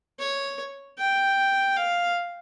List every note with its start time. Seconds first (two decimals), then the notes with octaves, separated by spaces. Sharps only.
0.19 C#5
0.98 G5
1.77 F5